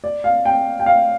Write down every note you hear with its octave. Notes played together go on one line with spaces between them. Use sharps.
D5
F5
G5
G5
F5